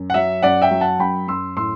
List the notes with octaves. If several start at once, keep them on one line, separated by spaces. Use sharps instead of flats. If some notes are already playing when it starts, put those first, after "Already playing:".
Already playing: F#2
F#5
F#3 E5
F#2 D5 F#5
E5 G5
F#3
F#5 A5
F#2 G5 B5
F#2 C6 E6
A2 C6 E6